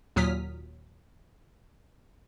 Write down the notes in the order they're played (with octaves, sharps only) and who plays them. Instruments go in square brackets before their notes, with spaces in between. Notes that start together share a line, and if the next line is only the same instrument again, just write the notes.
[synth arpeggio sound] D#2 A#2 F#3 D#6 F6 B6